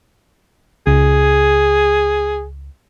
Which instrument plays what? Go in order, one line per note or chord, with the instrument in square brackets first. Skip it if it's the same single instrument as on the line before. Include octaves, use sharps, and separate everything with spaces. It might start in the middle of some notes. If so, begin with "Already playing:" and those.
[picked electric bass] C#2 [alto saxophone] G#4